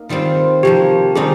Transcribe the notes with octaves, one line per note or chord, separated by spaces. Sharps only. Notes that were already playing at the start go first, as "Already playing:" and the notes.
Already playing: A#3 D#4 A#4
D#3 G3 C4 F4
C3 F3 A#3 G4
D#3 G3 C4 D#4 G#4